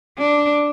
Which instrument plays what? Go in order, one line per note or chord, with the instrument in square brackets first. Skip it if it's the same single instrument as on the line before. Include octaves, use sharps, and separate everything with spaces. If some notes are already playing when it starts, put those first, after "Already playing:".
[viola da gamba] D4